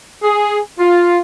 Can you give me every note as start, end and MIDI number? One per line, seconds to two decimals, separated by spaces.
0.23 0.59 68
0.79 1.19 65